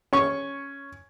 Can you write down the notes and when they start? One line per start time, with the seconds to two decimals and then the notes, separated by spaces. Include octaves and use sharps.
0.13 C#4 C#6